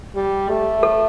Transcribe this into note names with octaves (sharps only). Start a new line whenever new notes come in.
G3
A3
A4